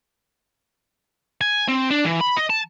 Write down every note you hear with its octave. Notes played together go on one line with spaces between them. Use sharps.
G#5
C4
D4
E3
B5
D#5
A5